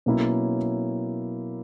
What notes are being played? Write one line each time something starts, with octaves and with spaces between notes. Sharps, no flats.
B2 F#3 A#3 C#4 E4